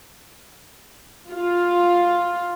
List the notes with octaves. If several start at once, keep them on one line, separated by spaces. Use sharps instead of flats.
F4